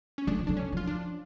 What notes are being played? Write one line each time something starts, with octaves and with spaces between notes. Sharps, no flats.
C#4
D3 D4
F3
D3 D4
C#4
F3 F4
D4